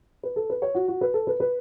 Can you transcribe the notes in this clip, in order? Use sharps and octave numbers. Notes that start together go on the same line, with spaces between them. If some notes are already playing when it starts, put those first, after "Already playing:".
B4
A4
B4
C#5
F#4
F#4
B4
A4
B4
B4